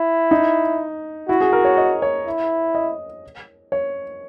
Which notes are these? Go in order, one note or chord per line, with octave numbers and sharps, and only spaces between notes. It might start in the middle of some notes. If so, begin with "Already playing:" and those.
Already playing: E4
D#4
E4 F#4
G#4
A#4
C#5
D#5
C#5
E4
D#5
C#5